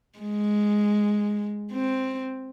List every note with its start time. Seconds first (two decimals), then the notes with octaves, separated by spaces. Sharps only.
0.19 G#3
1.72 C4